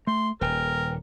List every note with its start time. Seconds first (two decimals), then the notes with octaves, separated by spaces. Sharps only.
0.07 A3 C6
0.41 D#1 A#4 B4 G5 G#5